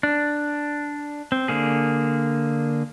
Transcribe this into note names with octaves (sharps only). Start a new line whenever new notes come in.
D4
C4
D3 A#3 G#4